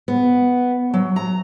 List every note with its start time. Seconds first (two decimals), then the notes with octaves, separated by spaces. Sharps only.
0.08 B3
0.94 F#3
1.16 A#5